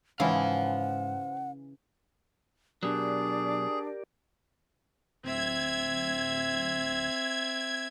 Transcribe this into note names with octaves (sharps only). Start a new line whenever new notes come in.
G#2 C#3 E3 E4 C5 F5 F#5
B2 F#3 D4 G4 G#4 A#4 D5
D1 C4 E5 G#6